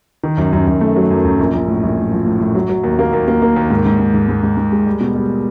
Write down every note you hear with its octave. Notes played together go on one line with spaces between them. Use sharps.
D#3
F#2
F#2
F#2
A3
F#3
F#2
F#2
A#1
A#1
A2
A#1
A2
F3
A2
A2
F#3
F#3
D#2
A#3
D#2
A#3
A#3
D#2
G#2
G#2
G#2
G#2
G#2
G#2
G#2
G#3
G3
B2
G3